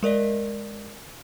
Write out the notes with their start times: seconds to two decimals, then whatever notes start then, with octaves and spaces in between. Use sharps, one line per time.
0.03 G#3 A#4 D5 D#5